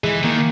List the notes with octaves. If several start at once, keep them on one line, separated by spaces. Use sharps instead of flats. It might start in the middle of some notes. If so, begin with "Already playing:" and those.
E3 G#3
D#3 A#3